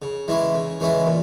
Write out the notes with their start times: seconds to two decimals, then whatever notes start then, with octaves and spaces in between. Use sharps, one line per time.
0.02 C#3
0.28 E3 G#3 C#4 E4
0.54 C#3
0.80 E3 G#3 C#4 E4
1.06 A#2